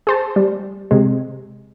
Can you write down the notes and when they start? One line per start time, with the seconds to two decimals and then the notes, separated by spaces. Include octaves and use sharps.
0.07 G#4 C5 A5
0.36 G3
0.91 C3 G#3